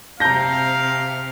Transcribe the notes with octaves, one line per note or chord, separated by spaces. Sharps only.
C3 C4 F5 A5 A#5 G6 A#6